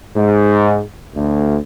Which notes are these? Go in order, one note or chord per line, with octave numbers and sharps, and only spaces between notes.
G#2
D2